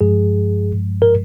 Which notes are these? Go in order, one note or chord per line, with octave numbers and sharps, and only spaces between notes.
G2 F3 G#3 G#4
A#4